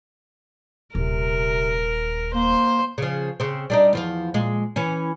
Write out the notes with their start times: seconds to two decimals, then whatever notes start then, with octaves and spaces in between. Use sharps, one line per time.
0.95 D#1 C3 A#4
2.35 A#3 C5
2.98 C#3 F3
3.40 C#3 C4
3.70 G3 D4 D#4
3.93 E2 F3 F5
4.34 A#2 G#3
4.76 E3 C#4